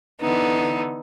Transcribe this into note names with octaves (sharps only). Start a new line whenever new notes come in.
D3 E3 B3 D#4